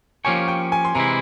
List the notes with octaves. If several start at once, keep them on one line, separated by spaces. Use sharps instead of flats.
F3 A#3 C#4 G4 C#5 G#5
G5
G#5
C6
C3 E3 G#3 E4 A#5